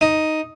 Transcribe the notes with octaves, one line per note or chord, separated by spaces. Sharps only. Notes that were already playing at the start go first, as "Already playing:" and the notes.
D#4